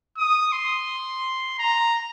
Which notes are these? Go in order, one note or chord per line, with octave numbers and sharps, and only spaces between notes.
D#6
C6
A#5